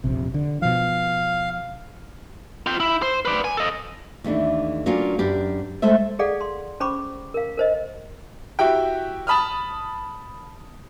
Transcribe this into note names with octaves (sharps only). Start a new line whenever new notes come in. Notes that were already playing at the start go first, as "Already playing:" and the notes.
E1 A#1 C3
D3
B2 F3 F5
F4 G5
E4
C5
B4 D5
G#5
A4 D#5
D#2 E3 A3 D4
F#3 A#3 C#4 D4 F4
F#2 D4 G4 B4
G#3 A3 A4 C5 E5
G#4 A4 D5 F5 F#5
C6
C#4 C5 B5 C#6 D6
A#4 F5
A#4 C5 D#5
E4 F#4 G4 G5
A5 B5 D#6 F6